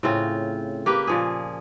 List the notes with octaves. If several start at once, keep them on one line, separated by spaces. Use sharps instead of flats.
A2 C#3 C4 F4
A#3 G4 B4
A#2 F3 G#4